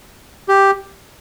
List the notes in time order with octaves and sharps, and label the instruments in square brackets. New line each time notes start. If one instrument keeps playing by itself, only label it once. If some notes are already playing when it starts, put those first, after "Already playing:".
[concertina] G4